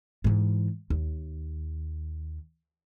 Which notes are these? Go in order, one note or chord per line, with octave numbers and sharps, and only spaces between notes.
G#2 E3
D#2